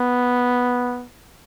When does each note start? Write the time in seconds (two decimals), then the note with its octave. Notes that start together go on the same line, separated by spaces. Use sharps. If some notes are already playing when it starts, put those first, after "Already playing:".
Already playing: B3